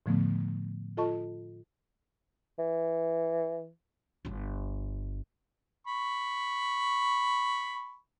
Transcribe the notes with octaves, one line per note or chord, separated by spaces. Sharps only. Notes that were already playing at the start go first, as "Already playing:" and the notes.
A2 D3 F3 A3 B3
F4 A4 D#5 A5 C#6
E3
G1 F4
B5 C#6